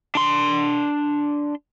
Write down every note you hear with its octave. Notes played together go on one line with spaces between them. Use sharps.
D4 C6